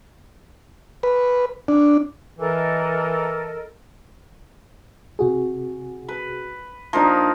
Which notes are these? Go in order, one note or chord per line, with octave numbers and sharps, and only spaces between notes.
B4
D4
E3 A4 A#4 D#5
C3 F#4 G#4
B4
F3 A#3 D4 D#4 A#5